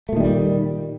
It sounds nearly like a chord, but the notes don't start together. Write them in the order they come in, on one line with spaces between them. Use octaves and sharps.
A3 A#2 D#3 G3